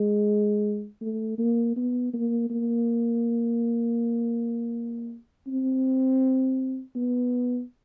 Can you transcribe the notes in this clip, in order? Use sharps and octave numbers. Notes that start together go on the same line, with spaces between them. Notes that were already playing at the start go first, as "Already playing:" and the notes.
Already playing: G#3
A3
A#3
B3
A#3
A#3
C4
B3